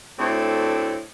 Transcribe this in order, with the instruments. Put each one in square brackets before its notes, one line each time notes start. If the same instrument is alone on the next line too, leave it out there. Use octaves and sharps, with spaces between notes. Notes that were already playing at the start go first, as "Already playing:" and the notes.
[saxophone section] D2 A2 C4